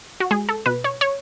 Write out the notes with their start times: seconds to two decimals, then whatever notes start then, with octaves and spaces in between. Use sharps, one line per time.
0.20 F#4
0.31 G#3 G#4
0.49 A4
0.66 B2 B4
0.84 C#5
1.01 C#5